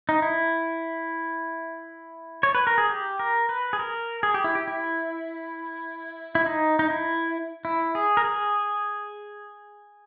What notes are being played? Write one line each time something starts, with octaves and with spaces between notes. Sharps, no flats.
D#4
E4
C#5
B4
A#4
G#4
G4
A#4
B4
G#4
A#4
G#4
G4
E4
G4
E4
E4
D#4
D#4
E4
E4
G#4
A#4
G#4